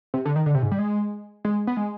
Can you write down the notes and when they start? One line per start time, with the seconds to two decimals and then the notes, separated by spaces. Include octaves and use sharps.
0.14 C3
0.25 D3
0.36 D#3
0.46 D3
0.55 C3
0.62 G#2
0.72 G3
0.79 G#3
1.45 G#3
1.67 B3
1.77 G#3